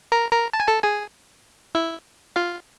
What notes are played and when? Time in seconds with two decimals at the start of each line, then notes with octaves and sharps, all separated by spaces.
0.12 A#4 A#5
0.32 A#4 A#5
0.53 A5
0.60 G#5
0.68 A4 A5
0.83 G#4 G#5
1.75 E4 E5
2.36 F4 F5